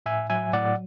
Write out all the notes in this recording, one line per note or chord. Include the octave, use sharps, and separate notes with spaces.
A2 E5 G#5
F#3 E5 G#5
A2 D5 F#5